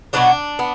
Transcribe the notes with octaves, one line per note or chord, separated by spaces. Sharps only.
B2 F#3 B3 D4
B3